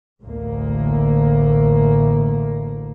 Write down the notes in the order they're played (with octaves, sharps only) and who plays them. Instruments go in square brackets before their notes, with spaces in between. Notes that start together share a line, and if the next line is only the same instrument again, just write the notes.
[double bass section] A1 D2 A#3